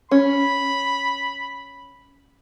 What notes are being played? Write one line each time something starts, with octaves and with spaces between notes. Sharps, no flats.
C#4 B5